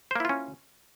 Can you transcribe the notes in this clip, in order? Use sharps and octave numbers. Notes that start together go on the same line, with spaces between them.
A#3 C#4 E4 F4 C5